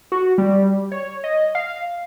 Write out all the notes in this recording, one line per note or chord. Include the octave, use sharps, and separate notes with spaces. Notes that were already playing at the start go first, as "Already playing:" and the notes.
F#4
G3
C#5
D#5
F5